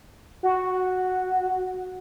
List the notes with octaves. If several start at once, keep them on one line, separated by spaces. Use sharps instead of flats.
F#4